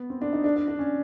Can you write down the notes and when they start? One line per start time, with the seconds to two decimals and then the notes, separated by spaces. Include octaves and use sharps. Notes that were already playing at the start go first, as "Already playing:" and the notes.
Already playing: B3
0.10 C4
0.22 D4
0.33 D#4
0.44 D4
0.56 D4
0.68 D4
0.79 C#4